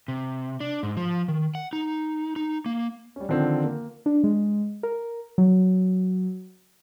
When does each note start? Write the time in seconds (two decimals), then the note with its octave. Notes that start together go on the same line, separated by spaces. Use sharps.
0.08 C3
0.60 D4
0.83 G#2
0.97 F3
1.28 D#3
1.55 F#5
1.73 D#4
2.36 D#4
2.66 A#3
3.16 G3 C#4
3.29 D3 D#3 F3 C4 D4
3.64 A#3
4.06 D4
4.24 G#3
4.83 A#4
5.38 F#3